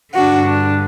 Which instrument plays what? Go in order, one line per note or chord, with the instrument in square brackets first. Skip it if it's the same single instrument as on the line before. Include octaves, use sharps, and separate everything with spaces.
[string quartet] G2 D3 D4 F#4
D4